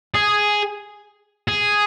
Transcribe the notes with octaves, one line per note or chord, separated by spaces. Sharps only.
G#4
G#4